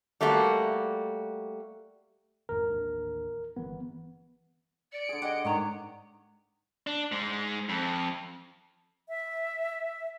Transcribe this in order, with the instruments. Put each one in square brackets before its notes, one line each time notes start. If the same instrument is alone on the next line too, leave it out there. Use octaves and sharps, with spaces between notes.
[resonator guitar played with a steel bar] G3 A3 A#3 F#4
[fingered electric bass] G#1 F2 G#2 [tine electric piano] A#4
[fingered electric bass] A1 D#2 D4
[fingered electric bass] G1 [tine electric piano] E3 B3
[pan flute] D5 [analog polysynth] C#7 D7
[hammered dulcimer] D3 G#4
[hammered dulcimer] G4 G#4 [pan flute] D#5 [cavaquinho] F#5
[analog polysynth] G#2 [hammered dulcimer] D#3 C#5 D#5 [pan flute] A#5
[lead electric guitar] D4
G#2 G#3
F2
[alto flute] E5